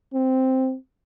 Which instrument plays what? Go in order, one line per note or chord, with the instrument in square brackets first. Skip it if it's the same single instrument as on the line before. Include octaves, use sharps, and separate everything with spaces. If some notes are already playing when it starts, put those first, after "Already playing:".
[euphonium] C4